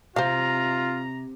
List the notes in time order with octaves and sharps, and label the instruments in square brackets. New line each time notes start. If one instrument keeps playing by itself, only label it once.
[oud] C3 [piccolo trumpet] F4 [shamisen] C5 F5 [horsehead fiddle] A#5